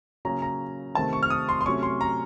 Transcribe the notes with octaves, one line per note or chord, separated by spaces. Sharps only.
C#3 F#3 A#3 C#4 A#5
A#5
C3 D#3 A3 C4 A5
C#6
F6
D#6
C6
C6
C3 F#3 A3 C#4 C#6
C6
A#5